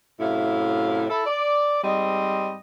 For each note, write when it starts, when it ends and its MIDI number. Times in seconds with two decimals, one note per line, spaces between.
0.20 1.05 42
0.20 1.05 45
0.20 1.05 48
0.20 1.05 64
0.20 1.05 77
1.10 1.23 64
1.10 1.23 69
1.26 1.79 74
1.83 2.57 44
1.83 2.57 55
1.83 2.57 60
1.83 2.57 75